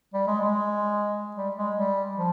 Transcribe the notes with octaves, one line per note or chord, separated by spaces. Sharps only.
G3
G#3
G#3
G3
G#3
G3
F3